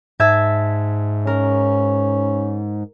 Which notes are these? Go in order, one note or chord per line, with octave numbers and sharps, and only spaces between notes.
G#2 E5 A5 G#6
C#4 A#4